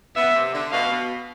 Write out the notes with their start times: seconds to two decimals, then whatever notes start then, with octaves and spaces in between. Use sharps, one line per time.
0.16 B3 E5
0.35 C3
0.53 D3
0.72 B2 F5
0.91 B2